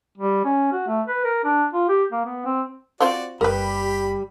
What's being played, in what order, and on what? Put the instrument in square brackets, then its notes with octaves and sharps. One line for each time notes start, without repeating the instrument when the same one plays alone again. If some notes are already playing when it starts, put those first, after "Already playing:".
[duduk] G3
C#4
F#4
A3
B4
A#4
D4
F4
G4
A#3
B3
C4
[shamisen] C4 F4 C5 [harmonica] F#4 D5
[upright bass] F#1 [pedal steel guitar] G3 [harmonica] G4 B5 [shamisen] A#4 B4